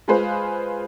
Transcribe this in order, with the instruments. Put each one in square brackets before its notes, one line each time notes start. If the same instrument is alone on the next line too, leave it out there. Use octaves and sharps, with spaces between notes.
[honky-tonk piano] G#3 F4 G#4 B4 C5 F5